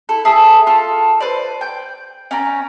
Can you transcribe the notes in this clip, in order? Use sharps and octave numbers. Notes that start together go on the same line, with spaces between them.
E4 A4
G#4 A4 E5 A5
F4 A4
B4 C5 D5
G5 G6
C#4 D5 G5 A#5